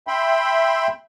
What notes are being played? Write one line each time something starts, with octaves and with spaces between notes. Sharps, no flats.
E5 G5 B5 C6